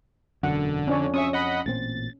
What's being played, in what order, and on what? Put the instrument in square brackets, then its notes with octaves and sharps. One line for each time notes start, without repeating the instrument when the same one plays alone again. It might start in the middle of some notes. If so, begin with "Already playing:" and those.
[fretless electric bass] E1 F#2 [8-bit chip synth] D3 [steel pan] F#5
[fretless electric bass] F2 [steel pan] C#4 D4 C#5
[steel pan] C#4 [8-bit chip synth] E5 C#6 D#6
[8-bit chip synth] D#5 F#5 B5
[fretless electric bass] A1 A#2 C4 [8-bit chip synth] A6